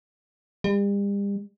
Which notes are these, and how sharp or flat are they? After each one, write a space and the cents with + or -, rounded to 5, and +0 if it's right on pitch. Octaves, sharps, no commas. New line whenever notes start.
G3 +40